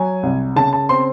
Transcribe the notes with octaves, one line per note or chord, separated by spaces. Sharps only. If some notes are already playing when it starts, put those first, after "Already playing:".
Already playing: F#3 G#5
C2
C#3 A5
A5
C4 C6